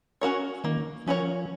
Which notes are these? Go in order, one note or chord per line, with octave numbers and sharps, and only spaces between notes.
C#4 F#4 A#4 C#5
D#3 A#3
F3 C#4 F#4 A#4 C#5